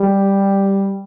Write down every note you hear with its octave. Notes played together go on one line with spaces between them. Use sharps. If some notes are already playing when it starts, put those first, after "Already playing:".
Already playing: G3